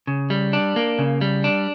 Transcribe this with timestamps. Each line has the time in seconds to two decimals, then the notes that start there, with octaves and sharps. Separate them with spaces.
0.07 C#3
0.30 G3
0.53 D4
0.76 A#3
0.99 C#3
1.21 G3
1.44 D4